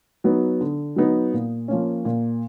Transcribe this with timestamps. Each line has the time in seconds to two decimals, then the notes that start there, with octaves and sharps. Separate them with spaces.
0.24 F#3 B3 D#4
0.61 D3
0.96 F#3 B3 D#4
1.33 A#2
1.68 F3 A#3 C#4
2.05 A#2